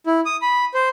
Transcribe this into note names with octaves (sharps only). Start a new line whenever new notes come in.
E4
D#6
B5
C5